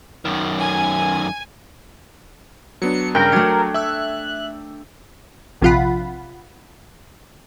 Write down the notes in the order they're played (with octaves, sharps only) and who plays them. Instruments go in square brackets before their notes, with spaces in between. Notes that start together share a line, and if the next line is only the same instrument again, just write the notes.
[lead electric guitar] F#2 D#3
[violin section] G#5
[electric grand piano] F#3 B3 D4 [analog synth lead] C#7
[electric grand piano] G2 C#3 G3 [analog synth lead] A#4 [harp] G5
[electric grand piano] F#3 G#6 C#7 [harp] A3 D4
[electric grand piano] E5 E6 [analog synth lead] F#6
[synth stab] A#1 C3 F3 F4 F#5 B5